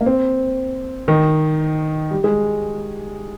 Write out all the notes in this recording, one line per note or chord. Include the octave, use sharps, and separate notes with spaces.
A#3
C4
D#3 D#4
G3 G4
G#3 G#4